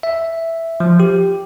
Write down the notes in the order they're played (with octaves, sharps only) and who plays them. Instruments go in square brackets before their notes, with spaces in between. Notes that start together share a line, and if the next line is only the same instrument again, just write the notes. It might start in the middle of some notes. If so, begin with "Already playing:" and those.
[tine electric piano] E5
F3
G4